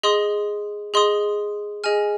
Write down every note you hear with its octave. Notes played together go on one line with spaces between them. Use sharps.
G#4 D#5 C6 D#6
G#4 D#5 C6 D#6
G#4 D#5 G#5 F6